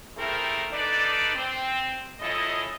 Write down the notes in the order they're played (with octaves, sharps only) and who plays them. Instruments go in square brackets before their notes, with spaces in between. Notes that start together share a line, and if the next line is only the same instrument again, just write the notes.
[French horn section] A3 C4 E4 G4 G#4 A#4
D4 D#4 A4 B4 D5
C4
C#3 F3 E4 A4 D#5